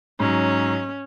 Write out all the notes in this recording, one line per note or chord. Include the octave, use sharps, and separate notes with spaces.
G#2 F#3 C#4